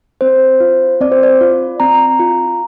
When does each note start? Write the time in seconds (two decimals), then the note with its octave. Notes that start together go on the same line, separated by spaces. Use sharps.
0.21 C4 C5
0.60 F4
1.01 C4 D5
1.12 C5
1.23 D5
1.41 F4
1.80 C4 A#5
2.19 F4